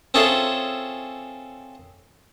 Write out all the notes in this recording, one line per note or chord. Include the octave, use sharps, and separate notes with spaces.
C4 C#4 F4 G#4 A4 E5